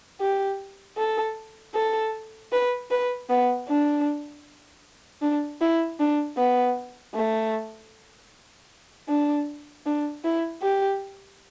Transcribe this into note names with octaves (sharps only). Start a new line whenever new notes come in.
G4
A4
A4
B4
B4
B3
D4
D4
E4
D4
B3
A3
D4
D4
E4
G4